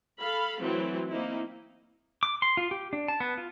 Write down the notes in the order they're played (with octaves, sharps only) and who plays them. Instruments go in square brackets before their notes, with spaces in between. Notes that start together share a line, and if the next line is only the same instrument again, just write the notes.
[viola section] A4 F5 B5
E3 F#3 A3 C4
A#3 C4 D#4 E4
[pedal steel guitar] D6
C6
F4
G4
D4
A5
B3
F4